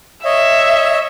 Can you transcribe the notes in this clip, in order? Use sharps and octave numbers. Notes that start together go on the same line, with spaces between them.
C#5 D#5 E5